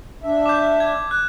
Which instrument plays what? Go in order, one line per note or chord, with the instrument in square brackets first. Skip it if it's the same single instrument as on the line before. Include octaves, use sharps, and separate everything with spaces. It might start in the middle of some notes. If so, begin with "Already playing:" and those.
[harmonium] D4 E5
[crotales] D6 G6
G#6
F#6